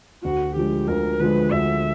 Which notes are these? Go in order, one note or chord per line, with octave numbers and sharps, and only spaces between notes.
D2 F#4
D3 F3 G#3 G4
D2 A#4
D3 F3 G#3 B4
D2 E5